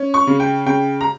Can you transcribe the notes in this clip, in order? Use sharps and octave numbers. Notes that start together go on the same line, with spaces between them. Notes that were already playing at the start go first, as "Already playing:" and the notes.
Already playing: C#4
C#6
C#3
G5
C#3 G5
A#5